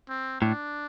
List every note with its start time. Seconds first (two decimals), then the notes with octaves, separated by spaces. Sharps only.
0.09 C4
0.41 A2 D4